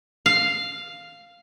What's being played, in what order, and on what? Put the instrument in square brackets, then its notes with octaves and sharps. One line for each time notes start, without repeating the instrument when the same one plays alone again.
[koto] F5